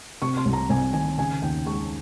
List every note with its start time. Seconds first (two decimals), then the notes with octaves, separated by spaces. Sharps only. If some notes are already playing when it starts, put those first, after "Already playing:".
0.22 C3 C#6
0.37 C6
0.45 C2
0.53 A#5
0.69 C2 G#5
0.93 D#3 G#5
1.18 C#3 G#5
1.42 D#2 G5
1.66 G#3 C#6